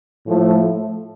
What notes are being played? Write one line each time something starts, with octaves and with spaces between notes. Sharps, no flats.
A2 F3 A3